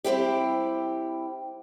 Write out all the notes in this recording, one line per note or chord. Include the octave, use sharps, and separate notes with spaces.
G3 C4 E4 G4